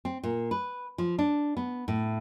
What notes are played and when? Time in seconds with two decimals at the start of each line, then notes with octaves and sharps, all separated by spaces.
0.05 C4
0.23 A#2
0.51 B4
0.98 F3
1.19 D4
1.57 B3
1.88 A2